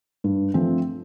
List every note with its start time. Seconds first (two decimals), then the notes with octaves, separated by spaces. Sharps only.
0.24 G2
0.54 F3 A3 C4